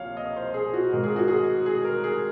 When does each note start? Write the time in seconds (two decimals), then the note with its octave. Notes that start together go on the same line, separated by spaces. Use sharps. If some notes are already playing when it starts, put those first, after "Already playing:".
Already playing: C2 C3 F3 A#3 C#5 F5
0.17 D#5
0.36 C5
0.54 G#4
0.73 F#4
0.92 G#2 D#3 G#3 A#4
1.03 G#4
1.16 F#4
1.28 G#4
1.66 G#4
1.85 A#4
2.04 G#4